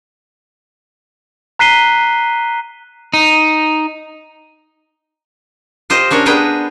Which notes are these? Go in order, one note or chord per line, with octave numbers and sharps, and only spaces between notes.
A#5 F#6 B6 C7 D#7 G7
D#4
F4 G4 C5 D#5
C#4 D4 A#4 C#5
B3 D4 G#4 B4 G5 A#5